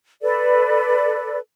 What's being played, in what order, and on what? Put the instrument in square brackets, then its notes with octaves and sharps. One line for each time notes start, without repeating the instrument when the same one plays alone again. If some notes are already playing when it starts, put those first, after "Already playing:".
[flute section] A4 B4 D5